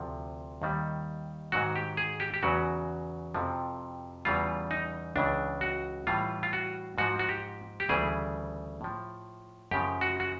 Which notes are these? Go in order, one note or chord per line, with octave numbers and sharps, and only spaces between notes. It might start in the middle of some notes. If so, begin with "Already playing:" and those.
Already playing: D2 C3 F3
D#2 D#3 G3
G#2 D#3 F#3 F#4
G4
G#4
G4
G4
E2 C#3 F#3 F#4
F2 C3 F3
E2 C#3 E3 G3 F4
D#4
C#2 C#3 E3 D4
F#4
A2 E3 G3 F4
F4
F#4
G#2 F3 F#4
F#4
G4
G4
D2 C#3 E3 G3 G#4
A2 F3
F#2 C#3 F3 G4
F#4
F#4